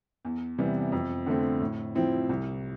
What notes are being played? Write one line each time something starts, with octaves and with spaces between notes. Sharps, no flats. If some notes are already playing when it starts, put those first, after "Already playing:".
E2
C3 E3 G3 B3
F2
D3 A3 C4
A2
F3 C4 E4
C2